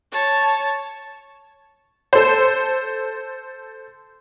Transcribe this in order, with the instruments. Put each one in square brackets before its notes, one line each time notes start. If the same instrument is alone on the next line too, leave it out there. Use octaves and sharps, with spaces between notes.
[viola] C#5 A5
[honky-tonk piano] A4 C5